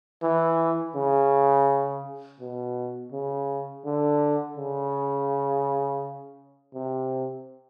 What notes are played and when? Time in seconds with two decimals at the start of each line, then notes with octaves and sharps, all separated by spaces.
0.23 E3
0.95 C#3
2.40 B2
3.12 C#3
3.85 D3
4.57 C#3
6.74 C3